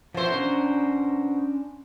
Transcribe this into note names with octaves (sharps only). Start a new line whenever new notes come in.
B2 F3 E4 C5
C#4 D4 A#5